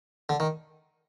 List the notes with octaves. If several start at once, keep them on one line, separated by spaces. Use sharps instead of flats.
D3
D#3